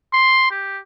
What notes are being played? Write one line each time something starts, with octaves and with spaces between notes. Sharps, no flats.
C6
G4